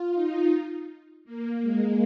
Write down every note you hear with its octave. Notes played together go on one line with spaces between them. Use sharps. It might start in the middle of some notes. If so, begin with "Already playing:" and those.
Already playing: F4
D#4
A#3
G#3